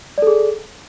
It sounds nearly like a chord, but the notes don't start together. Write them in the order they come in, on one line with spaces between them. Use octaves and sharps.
D5 A4 G#4